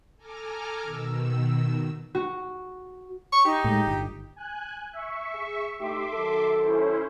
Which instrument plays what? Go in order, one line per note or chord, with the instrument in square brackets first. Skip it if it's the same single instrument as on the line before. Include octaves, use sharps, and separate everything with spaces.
[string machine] A4 G#5 A#5 D6 F6
B2 D#3 E6
[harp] F#4
[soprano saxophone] C#6
[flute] D#4 [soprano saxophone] G4
[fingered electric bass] A2 G#3
G1
[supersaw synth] G#5 F#6
E5 C#6
[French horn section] G#4
[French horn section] A3 D#4 G4 [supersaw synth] E5 C6 D6
[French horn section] D#3 F#3 A4
[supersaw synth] C#4 E4 C5